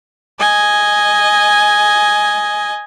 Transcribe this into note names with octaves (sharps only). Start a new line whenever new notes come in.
D#5 G#5